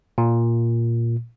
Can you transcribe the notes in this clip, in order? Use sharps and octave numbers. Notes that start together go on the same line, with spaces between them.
A#2